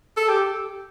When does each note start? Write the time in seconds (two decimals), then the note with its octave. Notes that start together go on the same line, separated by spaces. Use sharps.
0.17 A4
0.28 G4